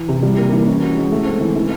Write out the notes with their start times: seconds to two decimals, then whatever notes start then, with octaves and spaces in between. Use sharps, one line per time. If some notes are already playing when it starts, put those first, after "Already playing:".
Already playing: E3
0.09 C3
0.23 G3
0.38 A#3
0.53 E3
0.67 C#4
0.81 F#4
0.97 G#3
1.12 A3
1.26 C4
1.40 E3
1.56 E3